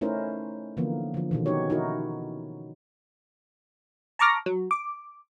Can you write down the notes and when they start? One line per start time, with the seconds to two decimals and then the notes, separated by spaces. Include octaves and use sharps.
0.01 A3 C#4 D#4 E4 A#4 C5
0.77 D3 E3 F3 A#3 B3
1.14 D3 F3
1.31 B2 D#3 E3
1.46 C#4 D#4 F#4 G4 C#5
1.70 D#4 E4 F#4 A#4
4.19 A5 A#5 C#6 D6 F6 A#6
4.46 F#3
4.71 D6